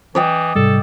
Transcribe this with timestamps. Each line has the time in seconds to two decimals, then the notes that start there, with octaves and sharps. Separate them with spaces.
0.15 E3 D5 D#5 G5
0.55 G#2 C3 G3 A4